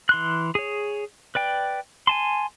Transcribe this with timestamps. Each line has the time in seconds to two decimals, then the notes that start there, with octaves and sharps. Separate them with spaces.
0.09 E3 C6 F#6
0.55 G#4 C#5
1.35 B4 D5 G5
2.07 G#5 A5 C6